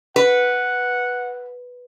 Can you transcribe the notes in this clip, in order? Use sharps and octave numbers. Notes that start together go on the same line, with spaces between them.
B4 F#5